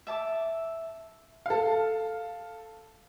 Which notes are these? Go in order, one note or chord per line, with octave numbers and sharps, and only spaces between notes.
E5 A5 D6
A4 F5